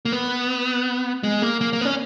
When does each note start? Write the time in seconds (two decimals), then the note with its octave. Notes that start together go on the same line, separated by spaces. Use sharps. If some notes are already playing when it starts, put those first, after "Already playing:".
0.05 A#3
0.12 B3
1.23 G#3
1.42 A#3
1.61 A#3
1.73 A#3
1.81 B3
1.85 C#4